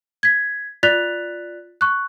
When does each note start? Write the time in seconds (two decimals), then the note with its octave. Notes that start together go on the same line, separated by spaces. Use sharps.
0.23 G#6 B6
0.83 F4 D5 F#6 A6 B6 F7
1.81 C#6 F#6